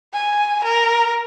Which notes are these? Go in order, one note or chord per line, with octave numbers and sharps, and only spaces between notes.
G#5
A#4